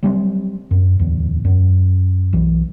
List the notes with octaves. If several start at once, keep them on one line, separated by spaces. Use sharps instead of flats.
F#3 G3 A#3 C4
F#2
D1 E2
F#2
B1 E3